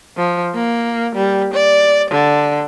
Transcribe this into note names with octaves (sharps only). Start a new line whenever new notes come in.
F3
A#3
G3
D5
D3